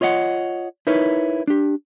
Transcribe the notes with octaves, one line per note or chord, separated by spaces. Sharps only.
F4 C#5 D#5 E5 F#5
D#4 E4 A#4 B4 C#5
D4 G4